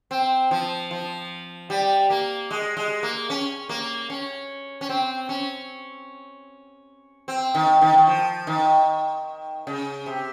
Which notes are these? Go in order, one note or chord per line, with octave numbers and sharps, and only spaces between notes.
C4
F3
F3
G3
A#3
G#3
G#3
A#3
C#4
A#3
C#4
C#4
C4
C#4
C4
D#3
D#3
D#3
F3
D#3
C#3
C3